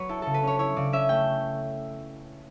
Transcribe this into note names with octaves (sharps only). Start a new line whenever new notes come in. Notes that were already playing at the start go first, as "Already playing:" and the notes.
Already playing: F#3 B3 B4 C#5
E4 A4
C#3 A4
B4
C#4 C#5
E4 C#5
C#3 D5
C#4 E5
A3 G5